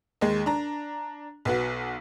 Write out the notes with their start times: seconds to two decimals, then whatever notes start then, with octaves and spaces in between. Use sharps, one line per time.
0.21 D#2 G#3
0.46 D4 A#5
1.45 B1 B3 F#4